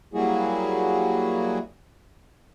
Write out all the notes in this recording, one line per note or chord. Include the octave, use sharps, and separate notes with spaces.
F#3 G3 A#3 E4 F#4 G#4